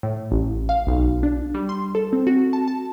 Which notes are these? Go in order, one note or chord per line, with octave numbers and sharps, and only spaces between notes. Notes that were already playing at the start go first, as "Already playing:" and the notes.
A2
A1
F5
B1
D4
G3
C6
A4
C4
F#4
A5
A5